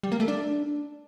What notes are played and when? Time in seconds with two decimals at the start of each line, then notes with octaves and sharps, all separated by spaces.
0.03 G3
0.12 A#3
0.20 A3
0.28 D4